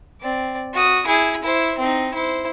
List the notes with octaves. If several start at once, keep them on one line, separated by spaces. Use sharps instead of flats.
C4 D5
F#4 D#6
E4 G#4
E4 C5
C4 D#4
E4 C5